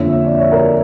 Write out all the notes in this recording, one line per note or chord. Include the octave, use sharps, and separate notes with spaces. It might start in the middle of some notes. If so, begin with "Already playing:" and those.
Already playing: F2 D3 F3 A#3 C#5 E5
D5
C#5
A#4 D5